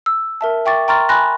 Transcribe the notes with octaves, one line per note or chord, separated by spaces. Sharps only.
E6
A#4 E5 A5
E5 G5 C#6 D6 A6
G5 A#5 C6 C#6 F6 A6
G#5 B5 C6 F#6 A#6